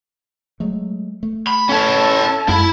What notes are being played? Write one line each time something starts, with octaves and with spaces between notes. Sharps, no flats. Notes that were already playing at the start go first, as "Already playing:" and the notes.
F#3 G#3 A3
A3
B5
C#4 E4 A4 A5
F#2 G#3 E4 B5